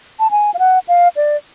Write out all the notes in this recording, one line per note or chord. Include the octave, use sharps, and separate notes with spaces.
A5
G#5
F5
F#5
F5
D5